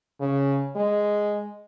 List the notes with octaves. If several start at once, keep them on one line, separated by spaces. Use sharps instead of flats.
C#3
G#3